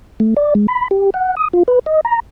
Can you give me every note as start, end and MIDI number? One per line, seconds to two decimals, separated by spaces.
0.20 0.34 57
0.37 0.54 74
0.55 0.67 56
0.68 0.88 83
0.91 1.10 67
1.14 1.35 78
1.37 1.48 87
1.53 1.63 65
1.68 1.79 71
1.86 2.01 75
2.05 2.20 82